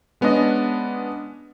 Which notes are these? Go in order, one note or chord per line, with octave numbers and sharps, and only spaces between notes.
G#3 B3 C#4 D4 D#5